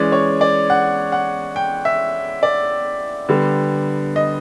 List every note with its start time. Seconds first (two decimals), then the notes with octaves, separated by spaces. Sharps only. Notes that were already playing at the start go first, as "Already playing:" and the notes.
Already playing: E3 G#3 C#4 D5
0.12 C#5
0.41 D5
0.70 F#5
1.12 F#5
1.56 G5
1.85 E5
2.43 D5
3.29 D3 G3 B3
4.16 D#5